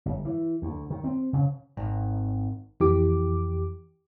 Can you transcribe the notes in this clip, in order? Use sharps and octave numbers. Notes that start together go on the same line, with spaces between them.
G1
E3
D2
D#3
C4
C#3
G#1
F2 E3 G4 D6